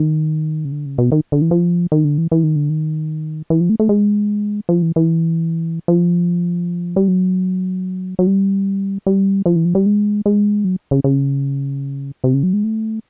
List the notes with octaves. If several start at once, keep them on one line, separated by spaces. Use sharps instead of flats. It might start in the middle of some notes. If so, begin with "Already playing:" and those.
Already playing: D#3
C#3
D3
C#3
B2
D#3
D3
E3
F3
D#3
D3
E3
E3
D#3
D3
D#3
E3
F3
A3
A3
G#3
F3
E3
E3
F3
G3
F#3
F#3
G3
G3
F3
E3
F3
G3
G#3
G#3
F#3
C#3
C#3
C3
C#3
F#3
G#3
A3